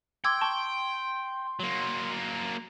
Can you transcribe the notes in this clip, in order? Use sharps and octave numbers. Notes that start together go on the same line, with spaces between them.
G5 C6 D6 E6 G#6
A5 C#6
F#3 A#3